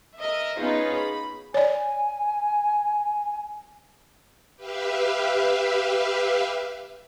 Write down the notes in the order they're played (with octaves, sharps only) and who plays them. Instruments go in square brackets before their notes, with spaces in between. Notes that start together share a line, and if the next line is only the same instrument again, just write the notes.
[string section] A#4 D#5 E5
B3 C#4 D#4 F4 G#4 B4
B5
[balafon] C#5 D5 [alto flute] G#5
[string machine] G4 B4 E5 F5